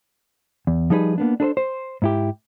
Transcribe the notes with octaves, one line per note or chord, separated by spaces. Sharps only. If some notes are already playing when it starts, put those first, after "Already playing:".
E2
F3 G3 D#4 G#4 B4
A#3 B3 D4
D4 A4 B4 C5
C5
G#2 E4 G4